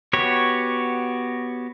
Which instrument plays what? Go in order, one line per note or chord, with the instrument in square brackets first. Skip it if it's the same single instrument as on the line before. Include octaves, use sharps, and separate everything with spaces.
[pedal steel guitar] B3 F#4 G4 C#5